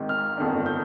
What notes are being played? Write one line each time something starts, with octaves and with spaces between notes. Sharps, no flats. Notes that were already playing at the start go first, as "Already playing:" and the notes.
Already playing: G#1 G#2 D#3
F6
G1 F2 D#3 G#3 D4
G6